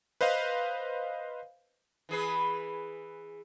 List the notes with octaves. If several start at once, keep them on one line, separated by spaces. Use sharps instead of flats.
B4 C5 D#5 F5
E3 G#4 B4